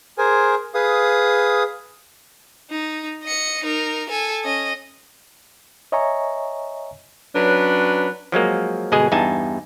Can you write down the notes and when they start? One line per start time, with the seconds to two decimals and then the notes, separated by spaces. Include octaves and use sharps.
0.18 G#4 A#4 C5 G#5
0.74 G#4 B4 F5 D#6
2.70 D#4
3.23 D#5 C#7
3.64 D#4 A#4
4.09 A4 G#5
4.44 C#4 D#5
5.92 C#5 D#5 E5 G#5 A#5 C#6
7.35 F#3 C#4 D4 B4
8.32 F3 F#3 G#3 A#3
8.92 G1 B2 G#3 G#4 D#5 G#5
9.12 E2 G2 D#4 G#5 A5